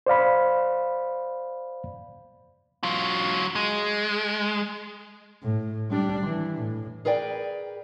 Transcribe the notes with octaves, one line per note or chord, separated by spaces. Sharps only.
C5 D5 F5 B5
F#3 F4
G#3
A2
G3 D4
E3
A2
G#4 A#4 B4 D5 G5